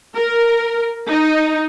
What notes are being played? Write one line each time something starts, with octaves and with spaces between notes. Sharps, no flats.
A#4
D#4